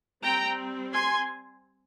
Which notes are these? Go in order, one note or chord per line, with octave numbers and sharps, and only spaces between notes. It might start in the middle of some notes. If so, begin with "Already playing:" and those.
G3 C4 G5 A#5
G#5 C6